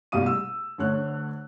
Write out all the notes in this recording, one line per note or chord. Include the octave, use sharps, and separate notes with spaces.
C2 B2 G3 F5 D#6 D#7
E6
D2 D3 C#5 F#6